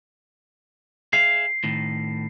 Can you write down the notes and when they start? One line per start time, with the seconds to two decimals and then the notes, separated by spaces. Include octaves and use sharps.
1.13 G#4 E5 F5 C7
1.64 A2 D#3